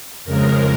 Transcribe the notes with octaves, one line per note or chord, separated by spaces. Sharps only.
F2 C#3 G#3 A#4